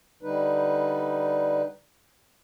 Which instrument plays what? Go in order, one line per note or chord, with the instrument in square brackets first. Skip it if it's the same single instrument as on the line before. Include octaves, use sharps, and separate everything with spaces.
[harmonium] D3 G3 D#4 B4